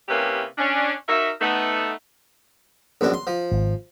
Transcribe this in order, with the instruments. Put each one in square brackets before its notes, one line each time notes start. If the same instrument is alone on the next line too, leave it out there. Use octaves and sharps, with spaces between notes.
[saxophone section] C3 A#3 C#4 E4 G4 B4
C#4 D4
D#4 F#4 A#4 E5
A3 B3 D#4
[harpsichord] A#1 F#2 D4
C6
F3
[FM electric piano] G#1